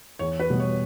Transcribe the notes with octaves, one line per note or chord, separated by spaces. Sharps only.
E2 C#5
B4
B2 G3 B3
C#5